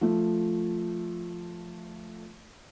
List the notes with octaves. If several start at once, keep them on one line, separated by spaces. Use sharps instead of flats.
F3 A3